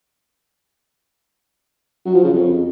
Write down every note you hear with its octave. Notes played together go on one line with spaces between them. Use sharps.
F#3
F3
C#3
F2